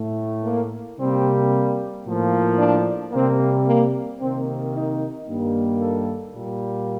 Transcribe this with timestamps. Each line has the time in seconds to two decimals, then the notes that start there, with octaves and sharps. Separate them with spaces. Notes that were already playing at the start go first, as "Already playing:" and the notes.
Already playing: A2 A3
0.44 A#3
0.98 C3 G3 A#3 C4
2.05 A2 F3 A#3
2.58 D4
3.12 C3 G3 A#3 C4
3.66 A#3
4.20 C3 D#3 A#3 C4
4.74 D#4
5.27 G2 D#3 G3 A#3
5.80 A4
6.34 A#2 G3 A#3